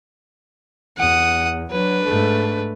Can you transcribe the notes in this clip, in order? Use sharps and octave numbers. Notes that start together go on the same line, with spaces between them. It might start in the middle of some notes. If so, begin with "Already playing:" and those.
E2 F#5 D#6
F#3 D4 B4
G#2 A3